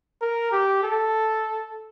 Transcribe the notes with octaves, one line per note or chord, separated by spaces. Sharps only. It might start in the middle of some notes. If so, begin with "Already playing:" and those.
A#4
G4
A4